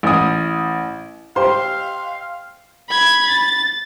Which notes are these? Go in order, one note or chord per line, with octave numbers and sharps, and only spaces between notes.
A1 D#6
G4 C5 F5 C6
B5 G#6
A6